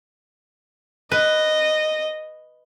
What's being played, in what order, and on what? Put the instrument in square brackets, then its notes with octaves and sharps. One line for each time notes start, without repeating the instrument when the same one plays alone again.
[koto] B4 [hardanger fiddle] D#5